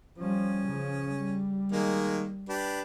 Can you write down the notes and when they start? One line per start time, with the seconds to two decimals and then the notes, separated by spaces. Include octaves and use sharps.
0.18 F3 G3 C#4
0.67 C#3 F3
1.16 G3
1.72 D#3 G#3 A#3
2.49 D4 G4 B4